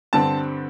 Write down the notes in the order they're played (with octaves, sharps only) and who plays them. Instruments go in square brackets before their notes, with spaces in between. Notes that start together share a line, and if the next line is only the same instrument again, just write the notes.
[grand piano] G2 D3 G3 C4 A5